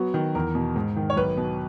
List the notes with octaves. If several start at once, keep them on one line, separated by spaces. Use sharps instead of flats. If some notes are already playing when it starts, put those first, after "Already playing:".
Already playing: F#3 B3 F#4
D#3
E2 A#4
B2
G#2
D#3
C#5
B1 B4
B2